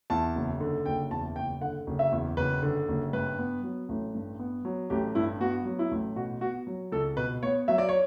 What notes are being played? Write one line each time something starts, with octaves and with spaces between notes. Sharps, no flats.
E2 A5
F#1
D3
F#1 G5
E2 A5
F#1 G5
D3 F#5
F#1
E5
E2
F#1 B4
D3
F#1
G2 B4
B3
F#3
A1
G2
B3
F#3
A1 G4
G2 E4
B3 F#4
F#3
E4
A1
B2 F#4
B3 F#4
F#3
C#2 A4
B2 B4
B3 C#5
F#3 E5
D5
C#5